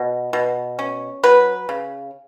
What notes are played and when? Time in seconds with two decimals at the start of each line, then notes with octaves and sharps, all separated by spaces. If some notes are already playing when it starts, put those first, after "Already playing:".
Already playing: B2
0.33 B2
0.79 C#4
1.23 F#3 B4
1.69 C#3